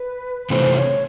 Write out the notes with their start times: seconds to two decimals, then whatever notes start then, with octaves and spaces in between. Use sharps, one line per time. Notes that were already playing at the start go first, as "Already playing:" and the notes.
Already playing: B4
0.50 C3 E3 A3 C5
0.75 C#5